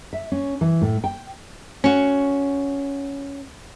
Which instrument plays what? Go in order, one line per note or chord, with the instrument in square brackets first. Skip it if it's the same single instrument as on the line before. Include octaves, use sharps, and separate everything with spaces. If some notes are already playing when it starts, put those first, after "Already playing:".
[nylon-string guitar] E5
C#4
E3
A2
G5
C#4 F#4